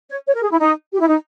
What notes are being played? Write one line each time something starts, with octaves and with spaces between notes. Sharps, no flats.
C#5
C#5
A#4
G#4
E4
D#4
G4
E4
D#4